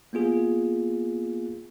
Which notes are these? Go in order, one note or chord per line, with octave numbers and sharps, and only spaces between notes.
A#3 B3 F4 G#4